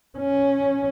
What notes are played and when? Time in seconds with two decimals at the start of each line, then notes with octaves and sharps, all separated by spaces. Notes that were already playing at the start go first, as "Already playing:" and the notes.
0.19 C#4